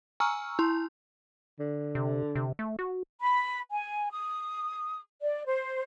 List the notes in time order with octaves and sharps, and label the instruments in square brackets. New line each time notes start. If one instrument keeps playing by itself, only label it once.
[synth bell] G#5 A#5 C#6 E6 F6
E4 C6
[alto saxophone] D3
[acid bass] C3
C3
A3
F#4
[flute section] B5
G#5
D#6
D5
C5